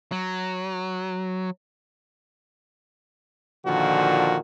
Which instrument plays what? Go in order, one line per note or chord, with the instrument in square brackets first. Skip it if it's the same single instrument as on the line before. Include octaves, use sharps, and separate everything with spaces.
[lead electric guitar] F#3
[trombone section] A#2 D3 D#3 F3 F#4